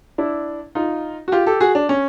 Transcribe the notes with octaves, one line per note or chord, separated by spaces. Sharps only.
D4 E4
D#4 F4
F#4
F4 G4
G4 A4
F#4 G#4
D4
C#4